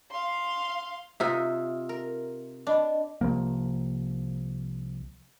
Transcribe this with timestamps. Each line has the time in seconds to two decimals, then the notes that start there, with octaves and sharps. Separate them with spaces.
0.11 F5 C6
1.20 C3 D#4 F4 E5 F5 D#6 E6
1.89 A#4
2.67 D4 D5 D#5 B5
3.21 C2 F3 A#3